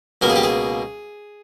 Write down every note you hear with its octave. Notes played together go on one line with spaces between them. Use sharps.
C#2 B2 A#3 A#4
G#4
G4
G#4